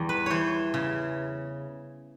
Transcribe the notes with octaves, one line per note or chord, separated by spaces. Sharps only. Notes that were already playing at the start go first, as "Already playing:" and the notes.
Already playing: E2 G3
B4
E3 C5 C#5
C#3